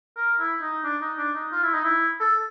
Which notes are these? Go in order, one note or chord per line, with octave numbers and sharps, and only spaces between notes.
A#4
E4
D#4
D4
D#4
D4
D#4
F4
E4
D#4
E4
A4